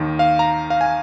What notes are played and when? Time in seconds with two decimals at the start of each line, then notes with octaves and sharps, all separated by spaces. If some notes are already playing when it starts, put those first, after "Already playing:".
Already playing: D#2 D#3
0.19 F5
0.39 A#5
0.70 F5
0.81 G#5